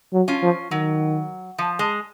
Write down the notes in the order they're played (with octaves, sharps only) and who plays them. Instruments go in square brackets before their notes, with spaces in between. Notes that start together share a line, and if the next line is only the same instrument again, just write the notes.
[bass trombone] F#3
[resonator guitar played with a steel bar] C#4 F4
[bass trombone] F3
[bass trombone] D#3 [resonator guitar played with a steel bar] F#3
[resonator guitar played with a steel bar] F3
G#3